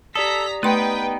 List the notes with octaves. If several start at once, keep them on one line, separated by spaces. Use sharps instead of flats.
G4 A4 D5 A#5 D#6 B6
A3 B3 D#4 B4 G5 C6